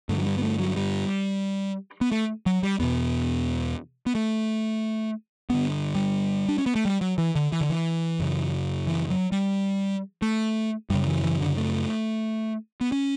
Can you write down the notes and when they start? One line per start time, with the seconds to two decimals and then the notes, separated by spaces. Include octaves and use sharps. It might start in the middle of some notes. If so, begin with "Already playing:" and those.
0.09 G2 D3 A3
0.18 F#3
0.26 G3
0.38 B3
0.43 A3
0.60 F#3
0.76 G3
2.01 B3
2.12 A3
2.46 F#3
2.63 G3
2.79 E2 B2 B3
4.06 B3
4.15 A3
5.50 G2 D3 B3
5.95 G3
6.49 D4
6.58 C#4
6.66 B3
6.75 A3
6.85 G3
7.01 F#3
7.18 E3
7.36 D3
7.52 E3
7.61 D3
7.70 E3
8.19 F#2 C#3
8.87 E3
9.10 F#3
9.32 G3
10.22 A3
10.90 F#2 C#3 G3
11.07 E3
11.23 E3
11.40 D3
11.57 A3
12.81 B3
12.92 C#4